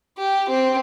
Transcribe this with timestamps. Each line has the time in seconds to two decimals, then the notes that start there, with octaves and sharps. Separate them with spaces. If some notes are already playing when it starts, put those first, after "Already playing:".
0.18 G4
0.49 C4